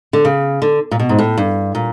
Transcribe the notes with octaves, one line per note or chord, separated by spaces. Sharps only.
D3
C#3
D3
A#2
B2
G#2
A2
G2
A#2